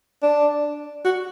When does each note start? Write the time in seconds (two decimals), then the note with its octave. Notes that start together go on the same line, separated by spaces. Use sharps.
0.23 D4
1.05 F#4